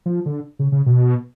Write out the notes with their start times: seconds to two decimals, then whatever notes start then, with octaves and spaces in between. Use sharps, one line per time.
0.06 F3
0.26 D3
0.59 C#3
0.72 C#3
0.86 B2